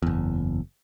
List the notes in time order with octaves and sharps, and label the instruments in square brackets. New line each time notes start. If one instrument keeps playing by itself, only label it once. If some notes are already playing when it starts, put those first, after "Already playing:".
[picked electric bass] F#1 E2